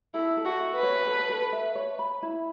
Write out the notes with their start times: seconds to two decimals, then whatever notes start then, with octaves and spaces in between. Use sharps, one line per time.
0.14 E4 A4
0.37 A4
0.45 F#4
0.60 E5
0.76 B4
0.83 C#5
1.07 A4
1.30 A4
1.53 E5
1.75 C#5
1.99 B5
2.23 E4